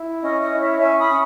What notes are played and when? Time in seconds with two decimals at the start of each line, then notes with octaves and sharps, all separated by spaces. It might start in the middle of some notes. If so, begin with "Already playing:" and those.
Already playing: E4
0.22 C#4 D#5
0.41 D#5
0.51 E4
0.60 C#5 E5
0.80 C#4 E5 G#5
0.99 B5 D#6
1.09 C#4